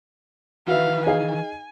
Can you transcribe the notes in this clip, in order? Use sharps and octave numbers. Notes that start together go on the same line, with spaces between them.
D#3 E3 F#4 B4 E5 F5
D#4 G#4 F5 G#5